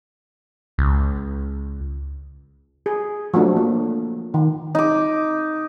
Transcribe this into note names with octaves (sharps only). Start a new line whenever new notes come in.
C#2
G#4
F3 F#3 A3 D4
A#3
D#3
D#4 D6